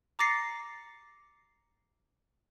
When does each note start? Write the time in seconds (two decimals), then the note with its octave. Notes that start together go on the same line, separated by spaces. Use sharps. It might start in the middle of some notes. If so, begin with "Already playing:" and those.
0.19 A#5 D6 A6 A#6 C7 C#7